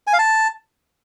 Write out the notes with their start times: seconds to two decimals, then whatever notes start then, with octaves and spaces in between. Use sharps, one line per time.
0.07 G#5
0.13 F5
0.19 A5